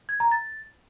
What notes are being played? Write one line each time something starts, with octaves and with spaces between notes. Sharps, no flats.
G#6
A#5
A6